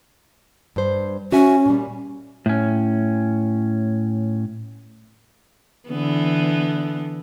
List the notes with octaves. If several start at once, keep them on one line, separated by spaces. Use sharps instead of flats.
G2 C5
C#4 F#4 E5 G#5
A#2 G3
A2 C#4
D3 E3 B3